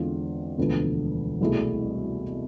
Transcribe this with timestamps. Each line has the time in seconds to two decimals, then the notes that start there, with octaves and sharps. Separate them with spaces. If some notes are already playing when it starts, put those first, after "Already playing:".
Already playing: E2 D3 G#3 C4 F4
0.58 E1 D2 D3 F3 B3
1.41 C2 B2 A3 E4 G#4